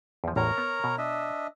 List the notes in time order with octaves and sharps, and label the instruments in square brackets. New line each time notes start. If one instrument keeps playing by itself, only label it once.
[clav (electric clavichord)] E2 F3
[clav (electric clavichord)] A1 E2 A2 [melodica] A#4 C#5 A#5
[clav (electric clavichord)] B3
B2
[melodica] D4 D#5 E5